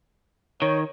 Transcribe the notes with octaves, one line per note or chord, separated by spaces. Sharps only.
D#3 C#5